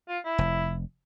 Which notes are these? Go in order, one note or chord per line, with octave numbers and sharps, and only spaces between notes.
F4
E4
F1